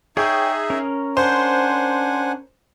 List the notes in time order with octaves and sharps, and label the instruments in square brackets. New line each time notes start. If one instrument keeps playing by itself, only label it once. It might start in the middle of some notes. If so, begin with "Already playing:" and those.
[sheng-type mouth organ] D#4 E5 [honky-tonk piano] G#4 [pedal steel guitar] C#5 G5
[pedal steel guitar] C#4 A#4
[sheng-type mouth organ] D4 F#5 G#5 [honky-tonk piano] C5